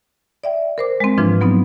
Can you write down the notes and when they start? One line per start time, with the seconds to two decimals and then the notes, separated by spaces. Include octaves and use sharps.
0.44 D5 E5 G5
0.78 A#4 C5 D6
1.00 G#3 C4
1.18 G#2 E3 F3 D4 F4 B4
1.41 F#3 B3 C4 D#4